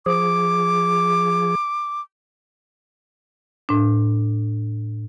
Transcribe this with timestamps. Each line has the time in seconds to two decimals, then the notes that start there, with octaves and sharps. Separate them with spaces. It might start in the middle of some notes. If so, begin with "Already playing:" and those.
0.06 F3 G#4 D6
3.69 A2 D4